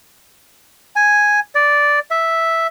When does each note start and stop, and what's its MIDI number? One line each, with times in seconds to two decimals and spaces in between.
0.96 1.40 80
1.55 1.99 74
2.11 2.67 76